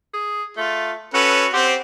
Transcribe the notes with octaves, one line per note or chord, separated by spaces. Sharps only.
G#4
A3 F4
C#4 F#4 A4 B4
C4 G4 C5 F#5